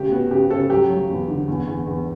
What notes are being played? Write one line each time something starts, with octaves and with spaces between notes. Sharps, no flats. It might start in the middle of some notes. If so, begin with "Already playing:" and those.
Already playing: C#3 A3 G4
B3 F#4
C#3 G4
C#3 A4
F#3 G4
F#3
E2
D3
E2
E2
E2